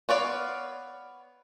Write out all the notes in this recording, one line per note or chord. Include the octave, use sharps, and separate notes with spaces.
B3 C#5 D5 F5